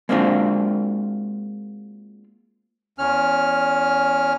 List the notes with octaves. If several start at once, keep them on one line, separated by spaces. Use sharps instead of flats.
G#3 A#3 C4 D4 F4 F#4
E2 C#4 F6